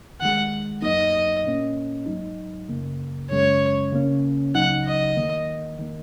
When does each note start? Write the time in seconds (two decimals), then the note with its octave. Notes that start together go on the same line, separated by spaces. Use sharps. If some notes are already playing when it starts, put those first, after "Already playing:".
0.21 D#2 D#3 G#3 F#5
0.82 F#2 F#3 A#3 D#4 D#5
1.44 A#2 A#3 C#4
2.06 G#2 F#3 D#4
2.69 F#2 C#3 A#3
3.31 F#2 C#3 G#3 C#4 C#5
3.92 C#3 A#3 C#4
4.55 C#2 C#3 F#3 D#4 F#5
4.85 D#5
5.17 D#2 D#3 A#3
5.79 D#3 A#3